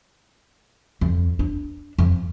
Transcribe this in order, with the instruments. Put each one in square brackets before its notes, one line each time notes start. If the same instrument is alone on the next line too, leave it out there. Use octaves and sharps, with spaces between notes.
[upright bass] F2
D4
F2